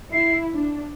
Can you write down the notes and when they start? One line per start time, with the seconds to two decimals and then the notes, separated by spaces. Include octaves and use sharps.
0.13 E4 C7
0.52 D4